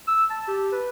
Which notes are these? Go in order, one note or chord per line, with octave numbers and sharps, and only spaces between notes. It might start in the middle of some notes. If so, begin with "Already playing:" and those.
E6
A5
G4
B4